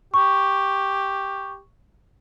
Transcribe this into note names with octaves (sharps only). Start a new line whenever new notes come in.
G4 C#6